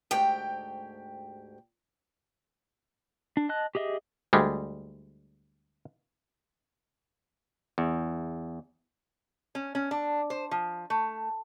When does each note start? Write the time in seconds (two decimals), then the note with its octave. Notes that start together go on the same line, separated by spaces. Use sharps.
0.11 D2 G#2 G4 G5
3.37 D4
3.49 D#5 A5 F#6
3.75 G4 G#4 D#5 E5
4.33 D2 G3 G#3
7.78 E2
9.55 C#4
9.75 C#4
9.91 D4
10.30 C5
10.51 F3
10.90 A3